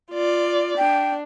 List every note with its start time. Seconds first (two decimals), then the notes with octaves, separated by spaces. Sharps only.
0.12 F4 D5
0.78 D4 G5